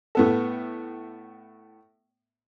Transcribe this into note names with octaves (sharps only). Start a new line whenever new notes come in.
A2 B3 A4